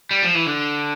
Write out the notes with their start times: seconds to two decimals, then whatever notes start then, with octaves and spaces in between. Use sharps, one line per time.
0.11 G3
0.23 F3
0.35 E3
0.46 D3